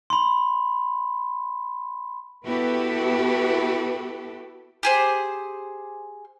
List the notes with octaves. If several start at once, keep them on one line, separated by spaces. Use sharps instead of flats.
B5 C6
B3 E4 F#4 G4 A4 B4
G4 G#4 C5